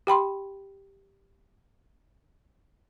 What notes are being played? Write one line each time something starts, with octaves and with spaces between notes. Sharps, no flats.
G4 G5 B5 C6